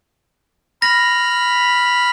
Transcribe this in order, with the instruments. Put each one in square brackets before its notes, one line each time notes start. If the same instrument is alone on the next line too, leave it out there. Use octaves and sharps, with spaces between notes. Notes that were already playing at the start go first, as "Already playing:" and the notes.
[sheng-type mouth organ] B5 F6 [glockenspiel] A#6